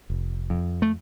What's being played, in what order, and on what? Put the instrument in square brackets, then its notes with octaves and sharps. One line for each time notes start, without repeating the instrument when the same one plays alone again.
[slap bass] F1
F2
A3